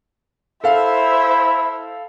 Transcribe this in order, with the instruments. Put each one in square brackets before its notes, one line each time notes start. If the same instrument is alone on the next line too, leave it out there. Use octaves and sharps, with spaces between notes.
[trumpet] E4 [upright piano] A4 F5 [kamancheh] C5 E5